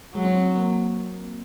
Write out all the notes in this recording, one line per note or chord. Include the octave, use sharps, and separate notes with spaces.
F#3 G#3
C4
C4
C4
A#3